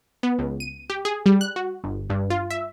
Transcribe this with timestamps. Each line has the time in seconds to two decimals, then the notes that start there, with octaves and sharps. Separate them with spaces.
0.23 B3
0.39 C#2
0.60 D#7
0.90 G4
1.05 G#4
1.26 G3
1.41 F#6
1.56 F#4
1.84 G1
2.10 G2
2.30 F4
2.50 E5